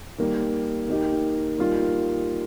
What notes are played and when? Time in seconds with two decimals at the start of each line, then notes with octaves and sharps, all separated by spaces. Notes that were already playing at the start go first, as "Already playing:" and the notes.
0.18 D#3 G3 A#3
0.88 D#3 A#3 D#4 G4
1.58 D#3 G3 A#3 F4